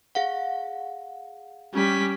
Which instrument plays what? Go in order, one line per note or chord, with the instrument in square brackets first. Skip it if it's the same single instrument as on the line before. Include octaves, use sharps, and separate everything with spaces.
[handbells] G#4 F5 F#5
[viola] G3 [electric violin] C#4 B6